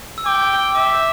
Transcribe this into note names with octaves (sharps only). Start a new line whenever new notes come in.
E6
G5 D6
E5 D6